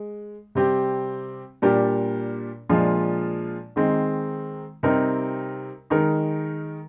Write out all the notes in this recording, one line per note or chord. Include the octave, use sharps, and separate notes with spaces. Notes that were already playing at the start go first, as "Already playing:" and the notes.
Already playing: G#3
C3 G3 C4 G4
A#2 G3 D4 G4 A#4
A#2 F3 G#3 D4 F4
D#3 G#3 C4 D#4
C3 G3 C4 D#4 A#4
D#3 G#3 D#4 A#4